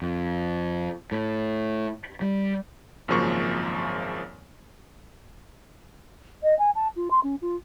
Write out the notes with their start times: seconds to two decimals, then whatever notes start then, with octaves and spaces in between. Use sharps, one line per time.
0.02 F2
1.12 A2
2.21 G3
3.08 G#1 F#2 C#3 F3 A#3 C#6
6.43 D#5
6.59 G#5
6.75 A5
6.96 F4
7.11 C6
7.23 C#4
7.42 F4